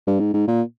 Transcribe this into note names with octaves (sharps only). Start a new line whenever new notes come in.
G2
G#2
G#2
A#2